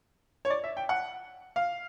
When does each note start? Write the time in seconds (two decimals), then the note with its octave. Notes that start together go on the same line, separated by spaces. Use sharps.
0.45 C#5
0.50 D5
0.64 E5
0.77 G5
0.89 F#5
1.56 F5